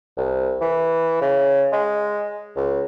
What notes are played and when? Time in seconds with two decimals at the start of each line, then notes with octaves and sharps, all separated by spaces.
0.17 C2
0.62 E3
1.21 C#3
1.72 G#3
2.56 C#2